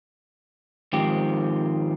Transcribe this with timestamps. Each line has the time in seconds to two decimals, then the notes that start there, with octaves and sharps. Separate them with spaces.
0.93 G#2 D#3 F3 C4 G4